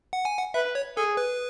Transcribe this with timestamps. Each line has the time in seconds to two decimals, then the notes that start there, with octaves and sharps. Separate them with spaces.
0.13 F#5
0.25 G#5
0.38 F#5
0.54 B4 E5
0.75 C#5
0.97 G#4 A4
1.17 B4